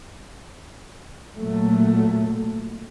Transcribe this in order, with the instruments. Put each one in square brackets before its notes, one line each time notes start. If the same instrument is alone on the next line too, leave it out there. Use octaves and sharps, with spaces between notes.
[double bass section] A#2 F#3 A3